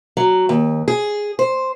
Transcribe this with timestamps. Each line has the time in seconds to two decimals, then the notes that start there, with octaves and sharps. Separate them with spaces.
0.17 F#3
0.49 D#2
0.88 G#4
1.39 C5